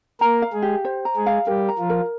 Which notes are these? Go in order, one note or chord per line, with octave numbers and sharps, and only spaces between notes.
A#3 A#4 A#5
F5
G#3 G#4
G4
C5
A#5
G#3 G#4
F5
G3 G4 A#4
A#5
F3 F4
A#4